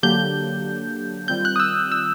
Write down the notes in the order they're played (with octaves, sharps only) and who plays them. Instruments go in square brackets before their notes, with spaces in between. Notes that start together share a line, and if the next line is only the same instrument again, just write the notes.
[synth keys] D3 F#3 A#3 D4 G4 [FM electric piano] G6
[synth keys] D#3 G3 C4 F4 [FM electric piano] G6
[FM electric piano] F#6
D#6
E6
E6